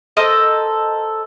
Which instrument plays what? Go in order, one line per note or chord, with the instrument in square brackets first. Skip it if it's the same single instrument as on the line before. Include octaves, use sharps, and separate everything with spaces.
[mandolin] A4 A#4 C5 D#5